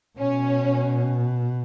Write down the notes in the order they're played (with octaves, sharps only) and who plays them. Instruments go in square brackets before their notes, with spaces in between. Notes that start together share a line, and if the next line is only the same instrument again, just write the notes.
[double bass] B2 [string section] C#4